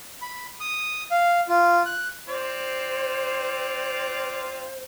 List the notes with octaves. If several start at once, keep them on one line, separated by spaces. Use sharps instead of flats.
B5
D#6
F5
F4
F#6
C4 F4 C5 D5